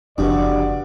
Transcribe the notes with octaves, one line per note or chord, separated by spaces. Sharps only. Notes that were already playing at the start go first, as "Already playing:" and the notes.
F#1 C2 F2 B2 D3 D4 F#4 D5